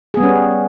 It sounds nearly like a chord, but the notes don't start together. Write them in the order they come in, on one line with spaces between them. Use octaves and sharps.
G#4 B3 G3 C#4